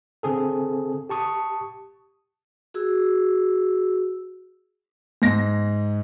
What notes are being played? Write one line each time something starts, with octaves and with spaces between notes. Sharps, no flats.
D3 C4 G#4 A4
G4 A5 C#6 D#6
F#4 G#4 E6
G#2 A#6